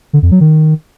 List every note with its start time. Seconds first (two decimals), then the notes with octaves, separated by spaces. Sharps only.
0.13 D3
0.22 F2
0.31 F#3
0.41 D#3